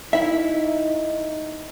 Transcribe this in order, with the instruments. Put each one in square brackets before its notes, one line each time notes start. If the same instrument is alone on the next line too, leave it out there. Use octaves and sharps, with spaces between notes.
[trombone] D#4 [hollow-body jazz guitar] E4 E5